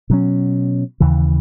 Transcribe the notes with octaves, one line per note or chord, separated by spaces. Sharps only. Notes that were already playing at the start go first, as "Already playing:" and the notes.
B2 F#3 C#4
D#2 C#3 E3